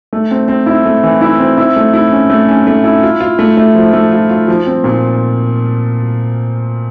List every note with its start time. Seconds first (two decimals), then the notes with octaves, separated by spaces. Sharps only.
0.13 A3
0.31 C4
0.48 C4
0.66 E4
0.86 A3
1.03 E3
1.21 E4
1.39 C4
1.58 E4
1.76 A3
1.94 E4
2.12 C#4
2.30 A3
2.48 C#4
2.67 A3
2.84 E4
3.03 F4
3.20 F4
3.39 A3
3.57 A3
3.75 F3
3.93 A3
4.12 F4
4.29 F4
4.48 F3
4.67 C4
4.84 A#2